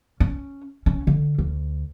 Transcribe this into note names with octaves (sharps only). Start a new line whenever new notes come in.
C#4
C#4
D3
D2